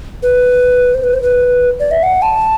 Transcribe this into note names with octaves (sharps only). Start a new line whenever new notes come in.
B4
C5
B4
C5
B4
D5
E5
F#5
A5